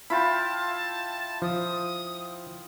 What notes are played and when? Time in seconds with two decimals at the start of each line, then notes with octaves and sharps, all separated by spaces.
0.10 E4 F4 G5 A5 B5
1.42 F3 D#6